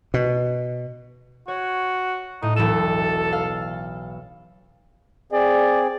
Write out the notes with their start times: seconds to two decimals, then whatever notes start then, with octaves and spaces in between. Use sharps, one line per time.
0.14 B2
1.48 F#4 C#5
2.42 A2 D#4
2.56 E1 B1 A4 E7
3.33 F5
5.32 C4 G#4 D5